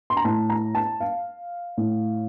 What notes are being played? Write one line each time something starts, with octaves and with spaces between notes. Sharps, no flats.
C6
A#5
A2 A5
A#5
A5
F5
A2